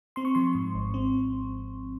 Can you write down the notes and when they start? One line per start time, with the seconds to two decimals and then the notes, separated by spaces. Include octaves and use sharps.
0.16 C4 C6
0.25 C#6
0.35 F3 C6
0.55 G#2
0.75 G#1
0.94 C4